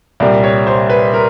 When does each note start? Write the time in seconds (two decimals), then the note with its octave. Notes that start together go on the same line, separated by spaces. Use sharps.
0.20 C2 A#2 G3 D5
0.44 C#5
0.67 C5
0.90 B4
1.14 A#4